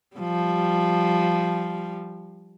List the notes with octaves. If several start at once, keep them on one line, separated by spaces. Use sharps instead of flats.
F3 G3